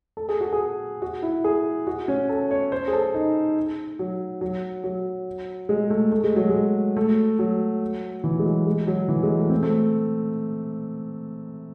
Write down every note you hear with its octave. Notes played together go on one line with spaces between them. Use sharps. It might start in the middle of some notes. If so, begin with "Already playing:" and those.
A4
G#4
F#4
G#4
F#4
E4
G#4
F#4
C#4
A4
C#5
C5
G#4
A4
D#4
F#3
F#3
F#3
G#3
A3
A3
G#3
F#3
G#3
A3
F#3
E3
G#3
F#3
G#3
F#3
E3
G#3
A3
C4
A3